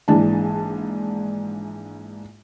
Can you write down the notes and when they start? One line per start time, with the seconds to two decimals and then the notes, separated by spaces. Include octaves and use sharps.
0.08 A#1 G#2 E3 D4 A5